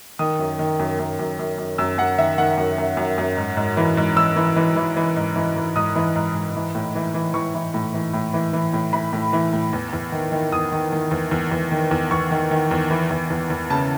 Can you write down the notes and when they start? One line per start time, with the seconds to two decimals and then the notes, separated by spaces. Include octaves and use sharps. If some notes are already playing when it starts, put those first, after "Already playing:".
0.19 D#3 D#6
0.39 F#2
0.59 D#3
0.79 F#2
0.99 F#2
1.19 F#2
1.39 F#2
1.58 F#2
1.78 F#2 E6
1.98 F#2 F#5
2.18 D#3 E5
2.38 D#3 F#5
2.57 F#2
2.78 F#2
2.97 F#2
3.18 F#2
3.37 G#2
3.57 G#2
3.77 E3
3.97 G#2
4.16 E3 E6
4.36 E3
4.56 E3
4.76 E3
4.96 E3
5.16 G#2
5.36 E3
5.56 E3
5.76 G#2 D#6
5.96 E3
6.16 G#2
6.35 G#2
6.55 E3
6.75 A2
6.95 E3
7.14 E3
7.34 E3 C#6
7.55 E3
7.74 A2
7.94 E3
8.13 A2
8.34 E3
8.53 E3
8.73 A2
8.93 E3 B5
9.13 A2
9.33 E3
9.53 A2
9.73 E2
9.93 E2
10.12 D#3
10.32 D#3
10.52 E2 D#6
10.72 D#3
10.92 D#3
11.11 E2
11.31 E2
11.52 E2
11.72 D#3
11.91 E2
12.11 E2 C#6
12.31 D#3
12.51 D#3
12.71 E2
12.91 E3
13.10 E2
13.30 E2
13.50 E2
13.70 C#3 A5